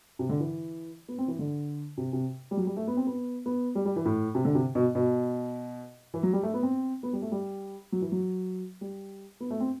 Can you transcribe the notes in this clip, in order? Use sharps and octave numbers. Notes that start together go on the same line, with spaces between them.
C3
D3
E3
B3
C4
E3
D3
C3
C3
G3
F#3
G3
A3
B3
C4
B3
B3
G3
G3
E3
A2
C3
D3
C3
B2
B2
E3
F#3
G3
A3
B3
C4
B3
G3
A3
G3
F#3
E3
F#3
G3
B3
A3
C4